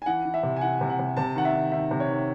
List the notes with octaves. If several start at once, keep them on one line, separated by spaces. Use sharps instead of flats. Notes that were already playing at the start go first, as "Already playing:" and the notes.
G#5
E3 F#5
E3
E5
C3
G#5
E3 F#5
C3
F#5
C3
C3 A5
D#3 F#5
E5
D#3
D#3 E5
C3
C#5
D#3